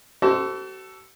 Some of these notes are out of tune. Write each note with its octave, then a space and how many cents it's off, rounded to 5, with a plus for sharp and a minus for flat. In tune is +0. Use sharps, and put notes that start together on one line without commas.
F#4 +45 A4 +0 C5 +0